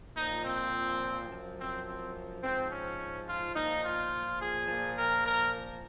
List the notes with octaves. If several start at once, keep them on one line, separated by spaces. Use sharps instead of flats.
A#2 F3 D#4
C4
F#2 F3
C4
C4
G#2 F3 C4
C#4
F4
A#2 F3 D#4
F4
G#4
A#2 F3
A#4
A#4